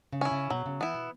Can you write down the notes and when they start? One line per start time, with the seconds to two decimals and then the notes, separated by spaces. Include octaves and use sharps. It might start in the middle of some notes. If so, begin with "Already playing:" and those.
0.12 C#3
0.21 C#4 E4
0.32 C#3
0.50 B2 F#3
0.66 C#3
0.80 E3 B3 E4
0.94 B2